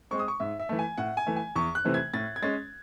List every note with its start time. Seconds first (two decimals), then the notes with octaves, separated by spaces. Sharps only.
0.11 G#3 C4 C#6
0.19 D#6
0.28 C#6
0.40 G#2 E5
0.59 E5
0.69 E3 A3
0.79 G#5
0.98 A2 F#5
1.17 G#5
1.27 E3 A3
1.36 G#5
1.56 E2 C#6
1.75 F#6
1.85 C3 E3 A3 C4
1.94 G#6
2.14 A2 A6
2.36 G#6
2.42 G#3 C#4 A6